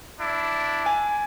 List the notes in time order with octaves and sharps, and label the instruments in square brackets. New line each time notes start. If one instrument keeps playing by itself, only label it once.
[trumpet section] D4 E4
[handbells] G#5